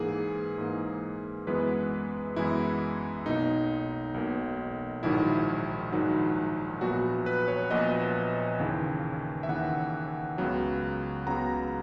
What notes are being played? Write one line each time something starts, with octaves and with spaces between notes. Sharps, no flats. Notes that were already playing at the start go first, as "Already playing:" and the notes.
Already playing: G#2 E3 A#3 G#4
G#2 E3 A#3
F#2 E3 G#3 B3 B4
F#2 E3 G#3 B3 E4
B1 B2 A#3 D#4
B1 B2 A#3
A#1 G#2 D#3 F#3 E4
A#1 G#2 D#3 F#3
A#1 A#2 F#3 B3 F#4
B4
C#5
A#1 A#2 F#3 B3 D#5
D#2 C#3 E3
E5
D#2 C#3 E3 F#5
C#2 C#3 F#3 B3
C#2 C#3 F#3 B3 A#5